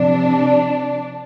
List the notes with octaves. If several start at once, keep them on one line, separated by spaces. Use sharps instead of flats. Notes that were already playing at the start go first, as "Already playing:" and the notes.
Already playing: C3 F3 D4